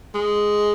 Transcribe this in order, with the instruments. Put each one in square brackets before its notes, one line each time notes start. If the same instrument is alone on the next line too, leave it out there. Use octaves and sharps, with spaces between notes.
[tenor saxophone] G#3